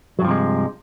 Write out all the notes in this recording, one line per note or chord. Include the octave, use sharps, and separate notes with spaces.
G2 C3 F3 F#3 G#3